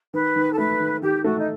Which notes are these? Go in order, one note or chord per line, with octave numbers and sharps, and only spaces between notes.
D#3 B4
D#3
A4
A3 B4
D#3
D#3 G4
A3 F#4
D#4